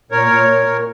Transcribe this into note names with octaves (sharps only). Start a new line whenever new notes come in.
A#2 A#4 C#5
A#2
A#2
A#2